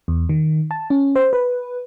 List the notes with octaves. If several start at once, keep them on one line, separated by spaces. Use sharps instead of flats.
E2
D#3
A5
C#4
C5
B4